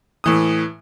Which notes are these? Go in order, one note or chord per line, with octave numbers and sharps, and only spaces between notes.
A2 E3 D#6